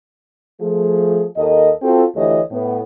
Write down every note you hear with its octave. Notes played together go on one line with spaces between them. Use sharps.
F3 A3 G#4
D#2 A4 A#4 D#5
C4 F4 F#4 A4
D2 E3 A3 G4 C#5 D#5
A2 B3